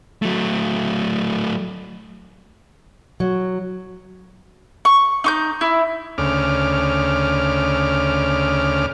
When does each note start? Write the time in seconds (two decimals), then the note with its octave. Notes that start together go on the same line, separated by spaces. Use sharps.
0.22 F#3 A3
3.20 F#3
4.85 C#6
5.24 D#4 C#6 G6
5.61 E4
6.18 D2 C#3 D6 F6